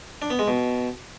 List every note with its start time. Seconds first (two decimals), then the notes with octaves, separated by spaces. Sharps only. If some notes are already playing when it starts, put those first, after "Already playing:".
0.22 D4
0.30 B3
0.39 G#3
0.48 B2